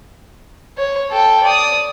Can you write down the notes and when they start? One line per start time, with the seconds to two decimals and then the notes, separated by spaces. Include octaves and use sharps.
0.78 C#5
1.11 A4 G5
1.43 D5 D#6